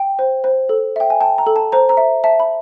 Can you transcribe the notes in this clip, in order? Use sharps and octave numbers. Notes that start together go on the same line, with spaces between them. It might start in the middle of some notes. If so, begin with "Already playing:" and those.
Already playing: G5
C5
C5
A4
E5 G5
G#5
G5 A5
A#5
A4
A5
C5 A#5
A#5
E5
E5 A5
B5